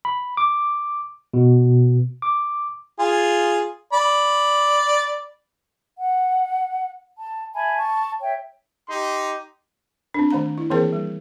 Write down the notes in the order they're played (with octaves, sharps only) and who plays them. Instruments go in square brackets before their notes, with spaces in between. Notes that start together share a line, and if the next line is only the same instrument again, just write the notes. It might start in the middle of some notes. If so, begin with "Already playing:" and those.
[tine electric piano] B5
D6
B2
D6
[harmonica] F4 G#4
D5 B5
[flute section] F#5
A5
E5 G#5 A5 B5
A5 C#6
C#5 E5 G5
[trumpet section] D#4 G4 C6
[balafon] C4 D4
D#3 A3 A#5
E4
E3 A#3 C4 G#4 A#4 C5
G3